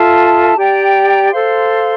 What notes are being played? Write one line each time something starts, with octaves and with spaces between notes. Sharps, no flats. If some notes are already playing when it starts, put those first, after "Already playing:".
Already playing: F4 A4 E5 A5
G4 D5 G5 A#5
A4 C5 F5 C6